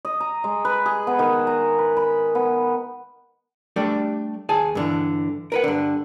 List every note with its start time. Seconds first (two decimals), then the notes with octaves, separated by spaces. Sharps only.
0.05 D#5
0.20 A#5
0.44 G#3
0.65 B4
0.86 G#4
1.07 B3
1.19 D#3
1.47 A#5
1.78 B4
1.97 B5
2.35 B3
3.76 G3 A3 D4 G4 A4
4.49 D#2 G#4 G#5 A5
4.75 G2 D3 E3
5.52 A#4 B4 F#5
5.64 G2 D3